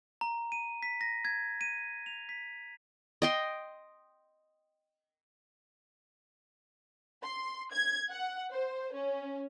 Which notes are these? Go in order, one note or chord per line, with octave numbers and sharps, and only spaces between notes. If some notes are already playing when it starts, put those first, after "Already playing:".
A#5
D#7
B6
A#6
G#6
D#7
F7
B6
D#5 G5 C6
C6
G#6
F#5
C5
C#4